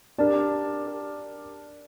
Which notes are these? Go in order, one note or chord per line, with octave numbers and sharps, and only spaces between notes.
D4 G4 A#4 D5 A5
G4 A#4 D5 A5